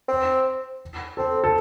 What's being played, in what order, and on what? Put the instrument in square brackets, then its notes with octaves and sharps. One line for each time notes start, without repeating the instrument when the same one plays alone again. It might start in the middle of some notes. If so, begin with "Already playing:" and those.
[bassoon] C4
[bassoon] C4 [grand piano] A4
[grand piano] A4